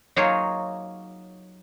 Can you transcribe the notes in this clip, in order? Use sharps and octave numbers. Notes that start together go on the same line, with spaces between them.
F#3 A#3 D#4 F4 G#4 C#5